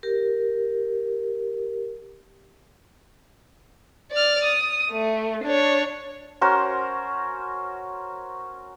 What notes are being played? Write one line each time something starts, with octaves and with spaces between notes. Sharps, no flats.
G4 A#4
D5 F6
D#6
A3
D4 C#5
C#4 F#4 A#4 C5